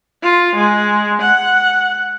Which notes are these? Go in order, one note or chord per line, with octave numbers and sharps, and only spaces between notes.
F4
G#3
F#5